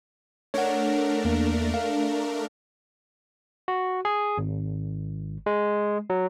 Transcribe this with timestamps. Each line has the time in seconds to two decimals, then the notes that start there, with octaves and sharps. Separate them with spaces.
0.54 A3 D4 A#4 C#5 F#5
1.25 E2 A#3
1.74 F5
3.68 F#4
4.05 G#4
4.38 G#1
5.46 G#3
6.10 F#3